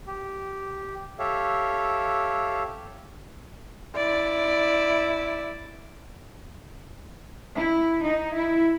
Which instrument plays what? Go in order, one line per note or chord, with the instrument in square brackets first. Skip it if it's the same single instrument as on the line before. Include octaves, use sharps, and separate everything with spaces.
[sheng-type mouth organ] G4
G4 A4 C#5 E5 F5
[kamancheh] E4 D5
[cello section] E4
D#4
E4